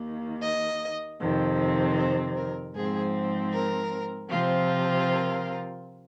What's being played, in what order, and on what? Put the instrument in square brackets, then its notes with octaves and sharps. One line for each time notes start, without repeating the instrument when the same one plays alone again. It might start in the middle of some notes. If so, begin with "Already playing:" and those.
Already playing: [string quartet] D#2 D#3 A#3
D#5
F2 C3 D#3 C4
C5
A#4
G#2 F3 C4 G#4
A#4
C3 F3 C4 F4
A#4